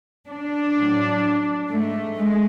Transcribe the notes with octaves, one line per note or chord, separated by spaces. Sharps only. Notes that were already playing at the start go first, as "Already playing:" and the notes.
D4
A2 F#3
G#2 G#3 A3
G#3